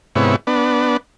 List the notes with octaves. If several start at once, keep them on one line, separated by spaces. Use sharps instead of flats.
G#2 C3 B3 E4 C#5
B3 D4